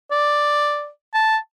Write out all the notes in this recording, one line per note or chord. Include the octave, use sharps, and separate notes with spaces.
D5
A5